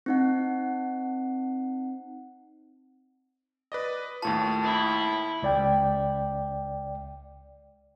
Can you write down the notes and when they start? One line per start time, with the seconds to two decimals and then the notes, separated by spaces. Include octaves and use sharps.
0.06 C4 D#4 F#5
3.72 B4 D5 D#5
4.22 D#2 A2 F4 A5
4.63 E4
5.43 C#2 D5 G5